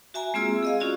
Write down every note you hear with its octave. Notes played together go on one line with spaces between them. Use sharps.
F#4 E5 G#5 A#5
G#3 A#3 C4 F4 G#4 E6
G#4 D#5 F5
C#4 F4 F#4 D5